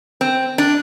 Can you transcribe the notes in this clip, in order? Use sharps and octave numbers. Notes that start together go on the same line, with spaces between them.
C4
D4